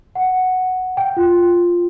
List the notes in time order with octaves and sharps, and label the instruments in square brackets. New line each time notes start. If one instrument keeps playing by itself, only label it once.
[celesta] F#5
G5
F4